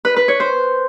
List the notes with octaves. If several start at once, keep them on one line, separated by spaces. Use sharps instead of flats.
B4
B4
C#5
C5